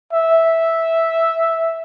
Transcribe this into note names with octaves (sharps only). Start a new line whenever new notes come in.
E5